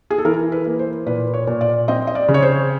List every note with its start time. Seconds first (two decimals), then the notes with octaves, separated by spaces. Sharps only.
0.10 G#4
0.18 A4
0.25 E3 A#4
0.52 B4
0.65 A#3
0.79 C5
1.06 A#2 B4
1.34 C#5
1.47 A#2
1.61 D5
1.88 C4 D#5
2.07 D#5
2.15 D5
2.28 C#3
2.34 C#5
2.42 C5